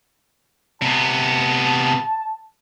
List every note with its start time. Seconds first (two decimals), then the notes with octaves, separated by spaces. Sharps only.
0.82 C3 B3 A5